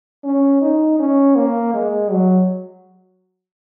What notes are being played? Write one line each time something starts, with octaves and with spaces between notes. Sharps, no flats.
C#4
D#4
C#4
A#3
G#3
F#3